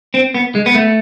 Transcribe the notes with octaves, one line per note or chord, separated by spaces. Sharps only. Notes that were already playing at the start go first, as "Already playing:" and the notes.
C4
B3
G#3
B3
A3